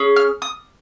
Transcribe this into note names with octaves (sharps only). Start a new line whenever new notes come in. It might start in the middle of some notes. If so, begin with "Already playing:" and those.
Already playing: C#4 G#4
F6
D#6